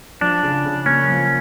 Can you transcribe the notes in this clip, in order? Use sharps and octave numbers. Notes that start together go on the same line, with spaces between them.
F3 D4
C#3
C#3
A#3 C#4
F3